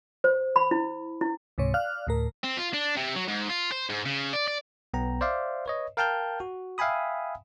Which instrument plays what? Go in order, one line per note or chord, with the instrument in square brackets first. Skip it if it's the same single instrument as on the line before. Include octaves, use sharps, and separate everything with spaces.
[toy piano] C5
B5
E4
E4
[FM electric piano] C#2 G#2 C3 C#5
D5 F5 F6 F#6
D2 A2 A#4
[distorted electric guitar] C4
F4
D4
C3
F#3
G#2
F4
C5
G#2
C#3
D5
D5
[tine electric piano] B1 B3 G5 A#5
C5 D5 E5 F5 D6
B4 C#5 D#5
A#4 F5 G5 A5 F6 G6
F#4
E5 F5 G5 G#5 B5 D#6